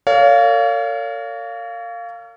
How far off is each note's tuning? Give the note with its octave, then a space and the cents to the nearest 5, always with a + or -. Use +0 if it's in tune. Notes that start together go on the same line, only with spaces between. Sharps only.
A#4 -45 C#5 +35 F5 +0